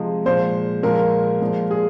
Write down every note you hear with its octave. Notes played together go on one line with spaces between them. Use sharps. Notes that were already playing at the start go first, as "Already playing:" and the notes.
Already playing: C3 F3 G#3 D#5
A#2 F3 G#3 C5
A#2 F3 G#3 A#4
A#2 F3 G#3
G#4